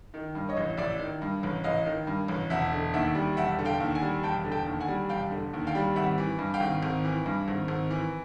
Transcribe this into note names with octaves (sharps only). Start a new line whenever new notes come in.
D#3
G2
C#5 D#5
A1
A1 D5 E5
D#3
G2
A1
A1 D#5 F5
D#3
G2
A1
E1 E5 F#5
D3
D#2 E5 F#5
G3
E1 E5 F#5
D3
F5 G5
D#2
F#5 G#5
G3
E1 G5 A5
D3
G5 A5
D#2
F#5 G#5
G3
E1 F5 G5
D3
D#2
F5 G5
G3
G#1 E5 F#5
E3
G2
F5 G5
G#1
G#1
E3
G2
G#1
G#1
E3